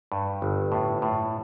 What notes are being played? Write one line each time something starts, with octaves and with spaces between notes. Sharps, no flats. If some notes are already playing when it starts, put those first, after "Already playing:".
G2
G1
A2
A2